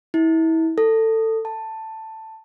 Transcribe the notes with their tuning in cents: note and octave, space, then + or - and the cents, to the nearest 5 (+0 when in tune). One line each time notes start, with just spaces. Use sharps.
E4 -30
A4 +20
A5 +10